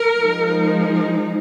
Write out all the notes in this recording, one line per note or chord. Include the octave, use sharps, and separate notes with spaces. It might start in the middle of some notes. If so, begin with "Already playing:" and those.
Already playing: A#4
F3 G#3 D#4